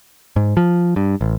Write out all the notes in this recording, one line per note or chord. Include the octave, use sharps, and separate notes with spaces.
G#2
F3
G2
A1